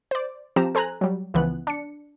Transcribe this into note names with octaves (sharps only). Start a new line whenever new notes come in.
C5 D5
F3 C4 G4 A#5 E7
A4 C5 G#5 A#5 F#6
F#3 G3
C#2 E3 F3 B3 F#6
D4 C#7